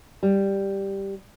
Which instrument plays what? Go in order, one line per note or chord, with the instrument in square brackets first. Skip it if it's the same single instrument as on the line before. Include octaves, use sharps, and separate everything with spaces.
[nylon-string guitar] G3